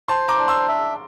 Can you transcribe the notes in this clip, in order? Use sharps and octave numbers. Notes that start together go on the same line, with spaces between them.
C5 A5 C6
A#5 D6
D4
C6 E6
E5